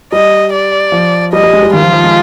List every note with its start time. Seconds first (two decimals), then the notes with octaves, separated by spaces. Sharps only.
0.12 G3 D#5
0.53 D5
0.92 F3
1.33 G3 D#5
1.43 G3
1.53 G#3
1.63 G3
1.73 D#3 F4
1.82 F3
1.92 F3
2.04 G#3